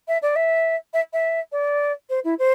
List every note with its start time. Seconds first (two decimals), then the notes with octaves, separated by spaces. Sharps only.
0.08 E5
0.22 D5
0.36 E5
0.94 E5
1.13 E5
1.52 D5
2.10 C5
2.24 E4
2.39 C5